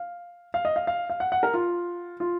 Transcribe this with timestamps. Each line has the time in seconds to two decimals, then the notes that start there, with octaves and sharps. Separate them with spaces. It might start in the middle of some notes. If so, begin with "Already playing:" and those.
Already playing: F5
0.54 F5
0.65 D#5
0.76 F5
0.87 F5
1.10 F5
1.20 F#5
1.32 F#5
1.43 A#4
1.54 F4
2.20 F4